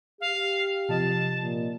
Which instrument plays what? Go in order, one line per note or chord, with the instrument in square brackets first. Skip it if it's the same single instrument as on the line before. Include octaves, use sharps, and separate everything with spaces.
[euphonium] G4 [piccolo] F5
[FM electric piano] C3 F3 D#5 [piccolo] A5
[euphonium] A#2